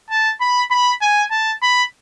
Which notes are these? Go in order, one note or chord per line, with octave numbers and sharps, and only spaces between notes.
A5
B5
B5
G#5
A5
B5